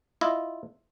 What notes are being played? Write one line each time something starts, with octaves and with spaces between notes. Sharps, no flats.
E4 F4 D#5